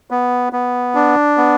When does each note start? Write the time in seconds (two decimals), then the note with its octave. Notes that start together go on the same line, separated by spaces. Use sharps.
0.11 B3
0.53 B3
0.95 D4
1.37 B3